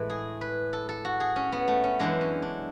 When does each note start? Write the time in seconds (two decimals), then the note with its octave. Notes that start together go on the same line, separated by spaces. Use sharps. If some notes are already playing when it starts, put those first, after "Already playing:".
Already playing: A2 E3 G#3 B4
0.10 G#4
0.41 B4
0.73 A4
0.89 A4
1.05 F#4
1.20 G#4
1.36 C#4
1.52 B3
1.68 A3
1.84 C#4
1.99 F#2 E3 G#3 D4
2.21 C#4
2.42 D4